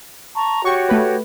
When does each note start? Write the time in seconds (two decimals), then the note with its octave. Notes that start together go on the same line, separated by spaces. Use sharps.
0.35 A5 A#5 C#6
0.65 F#4 G4 C#5 C#6
0.89 A3 B4